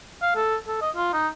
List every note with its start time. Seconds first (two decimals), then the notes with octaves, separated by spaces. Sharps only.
0.22 F5
0.36 A4
0.68 A4
0.82 D#5
0.96 F4
1.13 D#4